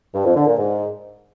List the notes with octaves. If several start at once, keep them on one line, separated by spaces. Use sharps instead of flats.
G2
F2
D3
A#2
G#2